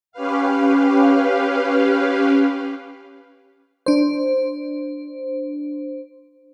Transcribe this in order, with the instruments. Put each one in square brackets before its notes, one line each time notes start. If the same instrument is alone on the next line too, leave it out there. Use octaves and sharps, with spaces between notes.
[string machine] C#4 G4 B4 F5
[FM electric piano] D4 C5